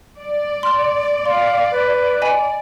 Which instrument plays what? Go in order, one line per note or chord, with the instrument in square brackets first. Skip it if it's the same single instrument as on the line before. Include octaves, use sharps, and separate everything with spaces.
[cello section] D5
[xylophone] C6 F6
[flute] F5 [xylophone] C6
[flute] B4
[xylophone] D#5 G#5 B5